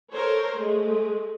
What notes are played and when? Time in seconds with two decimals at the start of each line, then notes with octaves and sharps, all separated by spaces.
0.12 A4 A#4 C5 C#5
0.57 G#3 A3